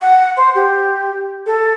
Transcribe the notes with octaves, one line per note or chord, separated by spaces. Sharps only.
F#5
C5
G4
A4